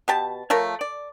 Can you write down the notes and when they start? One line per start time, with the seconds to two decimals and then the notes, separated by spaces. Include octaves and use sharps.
0.08 B2 G4 A5
0.50 F3 A3 A#4 C#5
0.81 D5